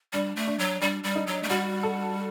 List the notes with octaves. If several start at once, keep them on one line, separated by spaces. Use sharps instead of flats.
G3 D4
A3
D4
F#3
G3 D4
G3
D#4
F#3
A3
G3 F#4
A4